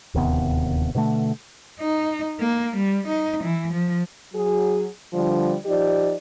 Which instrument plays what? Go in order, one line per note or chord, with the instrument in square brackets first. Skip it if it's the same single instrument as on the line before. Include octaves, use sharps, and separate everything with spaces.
[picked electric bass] D1 D#2 C3 B3
B2 D3 F#3 A3
[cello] D#4
A#3
G3
D#4
E3
F3
[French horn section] F#3 G#4
D3 F3 G3
F3 D#4 G4 D5